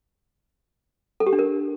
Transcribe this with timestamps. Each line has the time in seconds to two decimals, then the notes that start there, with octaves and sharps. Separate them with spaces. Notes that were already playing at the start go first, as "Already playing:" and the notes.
1.20 A4
1.26 G4
1.33 D4
1.39 A#4